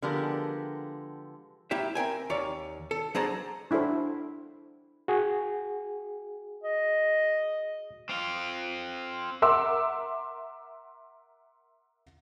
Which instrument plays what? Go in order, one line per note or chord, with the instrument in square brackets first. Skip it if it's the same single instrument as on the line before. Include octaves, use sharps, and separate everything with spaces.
[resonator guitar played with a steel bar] D3 F3 G#3 B3 G4 A#4
[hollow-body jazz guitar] A#3 E4 G4 E5
C4 A#4 G5 G#5
D#2 C#5 D5 F5
A4
F#3 D4 G#4 C5 A5 A#5
[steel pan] D4 E4 F#4 A4 C5
[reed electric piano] F#4 G#4
[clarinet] D#5
[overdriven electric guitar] C4 F4
[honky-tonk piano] A#4 E5 F#5 C6 D6 E6